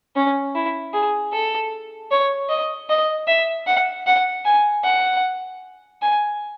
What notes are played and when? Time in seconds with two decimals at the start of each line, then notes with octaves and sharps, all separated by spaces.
0.16 C#4
0.55 E4
0.93 G#4
1.33 A4
2.11 C#5
2.49 D#5
2.89 D#5
3.27 E5
3.66 F#5
4.06 F#5
4.45 G#5
4.84 F#5
6.01 G#5